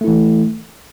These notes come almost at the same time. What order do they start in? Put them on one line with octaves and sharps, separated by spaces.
A3 E4 E3